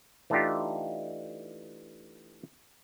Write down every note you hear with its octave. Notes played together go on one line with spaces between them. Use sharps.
E3 A3 D4 D#4 F4 G4